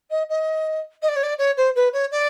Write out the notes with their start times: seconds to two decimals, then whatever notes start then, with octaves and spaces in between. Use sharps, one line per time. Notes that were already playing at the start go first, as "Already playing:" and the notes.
0.10 D#5
0.29 D#5
1.02 D#5
1.08 D5
1.16 C#5
1.23 D5
1.38 C#5
1.57 C5
1.75 B4
1.93 C#5
2.11 D5